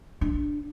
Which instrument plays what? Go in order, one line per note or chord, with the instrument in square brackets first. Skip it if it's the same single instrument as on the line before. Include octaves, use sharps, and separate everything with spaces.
[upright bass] D4